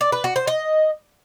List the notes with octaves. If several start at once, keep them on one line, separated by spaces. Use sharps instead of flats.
D5
B4
F#4
C5
D#5